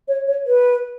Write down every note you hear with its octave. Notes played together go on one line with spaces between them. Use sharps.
C#5
C#5
B4